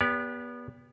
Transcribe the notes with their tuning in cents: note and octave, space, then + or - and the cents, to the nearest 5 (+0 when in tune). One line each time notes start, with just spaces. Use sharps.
B3 -25 G4 +20 D5 -35